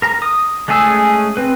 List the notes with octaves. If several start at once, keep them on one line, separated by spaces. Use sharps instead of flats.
A#4 A#5
D#6
G#3 A3 C#4 G#4 E6
C4 B4